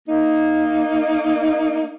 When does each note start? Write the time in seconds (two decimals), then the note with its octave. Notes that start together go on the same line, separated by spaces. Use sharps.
0.08 A#3 D#4